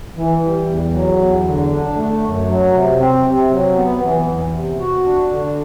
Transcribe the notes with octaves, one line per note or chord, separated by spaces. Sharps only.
E3
G3
E2
F#3
E2
D3
D4
A3
F#2
F#3
C3
C4
C3
F#3
B3
E3
E2
C3
F#4
D4
D3